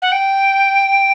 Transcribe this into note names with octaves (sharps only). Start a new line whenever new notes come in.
F#5
G5